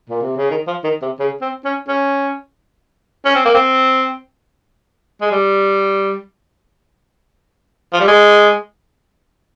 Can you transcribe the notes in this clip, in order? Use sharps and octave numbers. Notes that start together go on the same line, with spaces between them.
A#2
C3
C#3
D#3
F3
D#3
C3
C#3
C4
C#4
C#4
C#4
C4
A#3
C4
G#3
G3
F3
G3
G#3